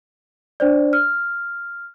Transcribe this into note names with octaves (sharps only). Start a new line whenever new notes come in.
D4 C5 D5
F6